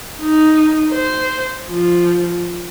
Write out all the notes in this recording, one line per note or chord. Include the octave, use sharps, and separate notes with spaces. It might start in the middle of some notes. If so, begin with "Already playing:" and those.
D#4
C5
F3